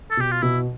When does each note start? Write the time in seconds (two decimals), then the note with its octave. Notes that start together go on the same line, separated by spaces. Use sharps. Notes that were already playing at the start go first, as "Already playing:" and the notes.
0.11 A4
0.17 B2 G4
0.31 F4
0.43 B2 E4